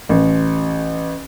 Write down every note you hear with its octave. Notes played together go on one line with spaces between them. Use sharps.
A1